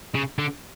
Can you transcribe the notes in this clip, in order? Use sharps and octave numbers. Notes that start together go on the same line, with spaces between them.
C#3
D3